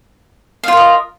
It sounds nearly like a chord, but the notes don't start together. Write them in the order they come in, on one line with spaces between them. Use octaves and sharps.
F5 F4 A#4 D#5